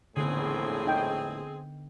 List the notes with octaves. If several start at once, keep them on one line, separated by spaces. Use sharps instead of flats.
A#1 E2 A2 D3 B3 C4 G#4
D#4 G5